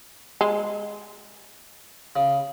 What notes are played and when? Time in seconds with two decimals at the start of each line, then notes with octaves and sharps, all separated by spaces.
0.41 G#3
2.16 C#3